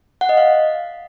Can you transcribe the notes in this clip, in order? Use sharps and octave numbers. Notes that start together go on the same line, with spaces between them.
F#5
D#5
F5